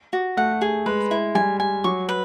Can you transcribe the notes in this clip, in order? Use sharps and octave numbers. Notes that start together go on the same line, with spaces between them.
F#4
A3 F#5
G#4
G#3 B4
E4
G3 G#5
G#5
F#3 C#6
B4